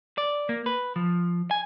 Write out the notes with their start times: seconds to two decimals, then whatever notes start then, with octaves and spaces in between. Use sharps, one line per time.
0.18 D5
0.49 A#3
0.66 B4
0.96 F3
1.51 G#5